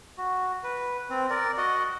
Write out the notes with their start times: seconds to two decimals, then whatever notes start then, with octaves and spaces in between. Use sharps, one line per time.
0.18 F#4
0.64 B4
1.10 C4
1.30 A#4 D5
1.58 F#4 D#5 F#5